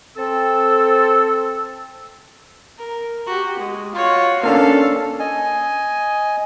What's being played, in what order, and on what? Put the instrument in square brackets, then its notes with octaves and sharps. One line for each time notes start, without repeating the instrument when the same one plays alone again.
[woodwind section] C4 A4 E6
[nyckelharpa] A#4
F#4 G4
G#3
[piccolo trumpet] F4 [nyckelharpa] F#4 C#5
[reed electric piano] A#3 C#4 D4 [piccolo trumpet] A4 [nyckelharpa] F5
[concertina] D#5 G#5